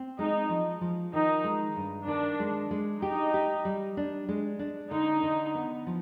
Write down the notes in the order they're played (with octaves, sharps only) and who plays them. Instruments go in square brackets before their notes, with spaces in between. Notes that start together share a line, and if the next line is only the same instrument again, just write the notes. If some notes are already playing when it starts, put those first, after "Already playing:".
Already playing: [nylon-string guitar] C4
[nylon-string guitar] G#3 [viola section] D#4
[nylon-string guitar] F3
F3
[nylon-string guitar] D#3 [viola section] D#4
[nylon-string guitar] G#3
G2
[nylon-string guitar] D#3 [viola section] D4
[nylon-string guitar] G#3
G#3
[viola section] D#4 [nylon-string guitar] G4
[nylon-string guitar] G4
G3
D4
G#3
D4
[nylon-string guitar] D3 [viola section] D#4
[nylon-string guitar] D3
B3
F3